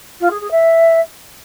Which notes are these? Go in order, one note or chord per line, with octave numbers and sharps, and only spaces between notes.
F4
G#4
G#4
E5